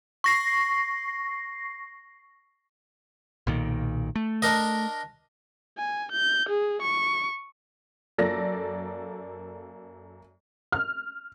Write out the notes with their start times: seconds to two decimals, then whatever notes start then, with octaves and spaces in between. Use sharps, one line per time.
0.24 C#6 A#6 C7
3.47 B1 A#2 D#3
4.16 A3
4.42 D4 A#4 D#5
5.78 G#5
6.12 G6
6.49 G#4
6.82 C#6
8.18 F#2 A#3 A4 D5 A#6
10.72 F6